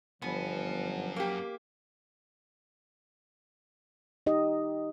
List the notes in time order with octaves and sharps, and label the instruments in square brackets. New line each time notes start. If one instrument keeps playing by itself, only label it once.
[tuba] G1 [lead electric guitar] F#2 G#5 [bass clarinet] F3 [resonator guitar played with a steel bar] B3
[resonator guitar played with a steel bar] A#3 G4
[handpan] D#4 G4 D#5